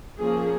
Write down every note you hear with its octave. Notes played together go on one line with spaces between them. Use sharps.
F3 A#3 C#4 G#4